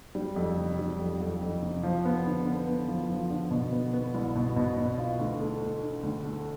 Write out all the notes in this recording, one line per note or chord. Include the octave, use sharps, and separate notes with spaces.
G3
F2
C3
G3
F2
F2
F2
C3
F3
B3
D3
B3
B3
F3
F3
D3
B2
B3
B3
C2
B2
B2
B2
F4
D2
A3
A3
D3
D2
A3